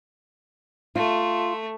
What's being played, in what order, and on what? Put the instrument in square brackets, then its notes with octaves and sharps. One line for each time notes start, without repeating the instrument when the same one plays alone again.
[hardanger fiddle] A3 [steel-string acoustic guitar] F4